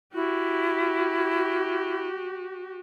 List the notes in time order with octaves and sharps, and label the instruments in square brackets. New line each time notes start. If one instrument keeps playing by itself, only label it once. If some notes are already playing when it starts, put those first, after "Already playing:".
[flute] E4 [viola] F#4 G4